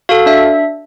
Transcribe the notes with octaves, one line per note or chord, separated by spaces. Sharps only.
F#4 A4 F5
D4 E5